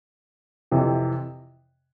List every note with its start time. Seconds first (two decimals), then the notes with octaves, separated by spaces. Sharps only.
0.72 F2 C3 E3